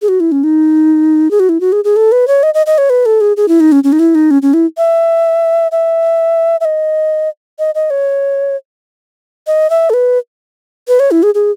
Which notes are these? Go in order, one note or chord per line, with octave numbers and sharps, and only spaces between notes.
G#4
F#4
E4
C#4
D#4
G#4
F#4
E4
F#4
G#4
G#4
A4
B4
C#5
D#5
D#5
D#5
C#5
B4
A4
G#4
G#4
E4
D#4
C#4
C#4
D#4
E4
D#4
C#4
C#4
E4
E5
E5
E5
D#5
D#5
D#5
C#5
D#5
E5
A4
B4
B4
C#5
E4
G#4
G#4